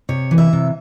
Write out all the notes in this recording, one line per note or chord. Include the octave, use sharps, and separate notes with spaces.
C3 C#5
E3
E5
C3